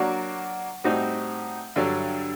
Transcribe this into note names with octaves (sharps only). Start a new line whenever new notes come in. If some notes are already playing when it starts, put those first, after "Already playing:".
Already playing: F#3 A#3 D4 F#4
A2 G3 C4 D#4 F#4
G2 D3 F#3